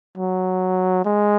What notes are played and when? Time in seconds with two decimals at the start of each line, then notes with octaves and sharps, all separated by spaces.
0.18 F#3
1.05 G#3